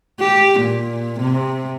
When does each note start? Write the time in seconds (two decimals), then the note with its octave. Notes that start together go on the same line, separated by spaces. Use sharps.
0.20 G4
0.61 A#2
1.20 C3